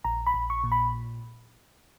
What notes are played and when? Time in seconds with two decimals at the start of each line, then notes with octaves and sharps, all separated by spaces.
0.05 A#1 A#5
0.27 B5
0.34 A#1
0.50 C#6
0.64 A#2
0.72 B5